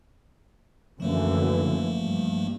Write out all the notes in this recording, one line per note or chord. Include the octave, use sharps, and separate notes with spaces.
F#2 D3 E3 F3 A3 A#3
G2